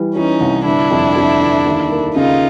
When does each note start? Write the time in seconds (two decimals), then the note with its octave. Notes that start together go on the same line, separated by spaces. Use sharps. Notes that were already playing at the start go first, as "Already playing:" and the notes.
Already playing: E3 G3
0.16 E3 C#4 D#4
0.40 C2
0.65 G1 D4 E4
0.91 F2
1.16 F2
1.40 G1
1.66 D#2
1.91 A#3
2.15 C#3 D#4 F4